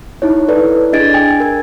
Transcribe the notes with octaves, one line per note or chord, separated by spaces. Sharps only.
D#4 E4 C#5
E4 A4 B4 D5
D4 G#4 D#5 G#6 A6 D7
G5 G#5
A#4 G#6